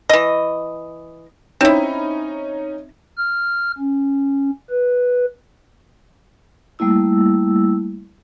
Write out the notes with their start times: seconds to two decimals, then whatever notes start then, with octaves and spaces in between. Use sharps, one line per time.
0.09 E3 D#5
1.61 C4 C#4 D#4 E4
3.17 F6
3.78 C#4
4.70 B4
6.79 G3 A3 A#3 E4 E6